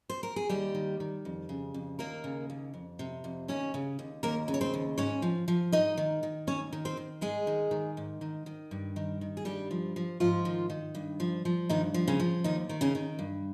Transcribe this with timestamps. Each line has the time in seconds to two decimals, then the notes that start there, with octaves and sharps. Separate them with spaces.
0.10 C5
0.23 A#4
0.36 G#4
0.49 D#2 G3 G4
0.75 D#3
1.00 D#3
1.25 F2
1.49 C#3
1.74 F2
1.99 D#2 A#3 A#4
2.24 C#3
2.50 D#2
2.74 F2
2.99 C3
3.24 F2
3.48 D#2 C#4 C#5
3.74 C#3
3.99 D#2
4.23 D#2 A#3 A#4
4.48 C#3
4.54 C#5
4.61 C4 C5
4.74 D#2
4.98 G#2 C#4 C#5
5.22 F3
5.48 F3
5.72 G#2 D#4 D#5
5.97 D#3
6.23 D#3
6.47 D#2 C#4 C#5
6.73 D#3
6.85 C4 C5
6.97 D#3
7.21 G#2 G#3 G#4
7.47 D#3
7.71 D#3
7.97 G#2
8.21 D#3
8.46 D#3
8.71 G2
8.96 D#3
9.21 D#3
9.37 G#4
9.45 G2 G3 G4
9.71 F3
9.96 F3
10.20 G#2 F3 F4
10.45 D#3
10.70 D#3
10.95 G2
11.20 F3
11.45 F3
11.69 G2 D#3 D#4
11.94 F3
12.08 C#3 C#4
12.19 F3
12.44 D#2 D#3 D#4
12.69 D#3
12.81 C#3 C#4
12.95 D#3
13.19 G2